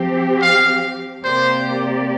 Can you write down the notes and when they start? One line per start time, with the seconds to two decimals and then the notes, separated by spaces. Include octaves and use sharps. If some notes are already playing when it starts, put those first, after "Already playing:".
Already playing: F3 C4 G4
0.42 F5
1.23 C3 A#3 G4 C5 D5